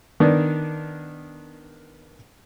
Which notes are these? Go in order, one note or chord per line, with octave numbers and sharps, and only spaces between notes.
D#3 B3 D4 D#4